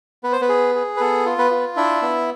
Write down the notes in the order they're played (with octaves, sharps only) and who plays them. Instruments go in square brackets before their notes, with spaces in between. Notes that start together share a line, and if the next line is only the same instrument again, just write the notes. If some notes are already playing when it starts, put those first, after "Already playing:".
[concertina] B3 B4
C5
B3 B4
G#4
G#4
B4
B3 A4
F4
B3 B4
F4
D4 E4 E5
B3